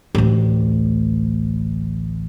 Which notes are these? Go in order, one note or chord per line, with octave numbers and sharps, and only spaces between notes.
A1 D2